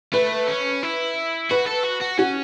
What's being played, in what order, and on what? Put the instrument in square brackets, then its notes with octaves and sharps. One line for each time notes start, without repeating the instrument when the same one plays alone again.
[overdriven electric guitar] A3 [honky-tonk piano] B4
[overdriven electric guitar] C#4
E4
[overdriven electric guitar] F#4 [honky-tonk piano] B4
[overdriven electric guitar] A4
F#4
F#4
[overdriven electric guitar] C#4 [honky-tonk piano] F#4